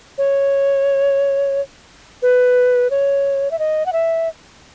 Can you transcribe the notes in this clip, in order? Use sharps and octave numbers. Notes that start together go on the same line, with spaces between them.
C#5
B4
C#5
E5
D#5
F#5
E5